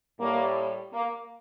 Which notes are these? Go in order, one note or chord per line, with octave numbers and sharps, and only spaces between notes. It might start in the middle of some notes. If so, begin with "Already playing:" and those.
A2 G3 A#3
A#3